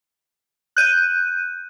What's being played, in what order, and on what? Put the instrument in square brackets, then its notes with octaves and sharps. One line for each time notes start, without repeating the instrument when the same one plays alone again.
[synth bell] F#6 G6 D#7